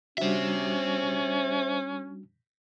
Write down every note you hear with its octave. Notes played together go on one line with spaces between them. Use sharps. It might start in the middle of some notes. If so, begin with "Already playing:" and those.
G3 C#4 D4 F#4 C5 E5